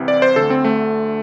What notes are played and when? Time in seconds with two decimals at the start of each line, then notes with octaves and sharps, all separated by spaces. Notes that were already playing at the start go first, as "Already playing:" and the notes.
Already playing: C2 C3 E3
0.08 D5
0.22 C5
0.36 D2 D3 A4
0.50 C4
0.65 A3